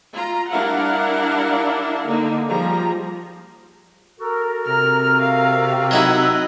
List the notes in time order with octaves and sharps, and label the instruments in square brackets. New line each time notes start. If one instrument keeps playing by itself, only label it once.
[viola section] F4 A#5
G3 D4 E4 A#4 F5 F#5
D3 A#3 D#4
F3 G3 G#4 A#5
[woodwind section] F#4 A4 A#4
[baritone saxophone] C3 [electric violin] F6
[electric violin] F5
[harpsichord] F#3 D#4 E4 [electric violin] D#5 F#6 [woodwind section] F#5 B5 E6